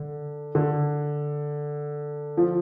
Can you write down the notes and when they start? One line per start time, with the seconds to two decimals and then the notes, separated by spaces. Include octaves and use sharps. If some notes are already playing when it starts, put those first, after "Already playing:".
Already playing: D3
0.55 D3
2.37 F3